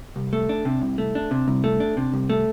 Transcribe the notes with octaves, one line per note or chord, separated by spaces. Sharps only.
C2
A3
D4
C3
C2
A3
D4
C3
C2
A3
D4
C3
C2
A3